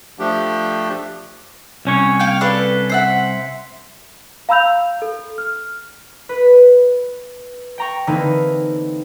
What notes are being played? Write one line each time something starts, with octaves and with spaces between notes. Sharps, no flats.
F3 A3 D4 G4
C2 C#4 C#5
A#3 F5 G5
D4 A4 B4
C5 E5 F#5
F5 A#5 B5 E6 G6 F7
A4
F6
B4
G5 A#5 C#6
D3 E3 A#3 C4 D#4 E4